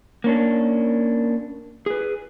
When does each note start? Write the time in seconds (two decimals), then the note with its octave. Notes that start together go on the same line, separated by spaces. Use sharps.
0.24 A#3 C#4 D4
1.86 G#4 B4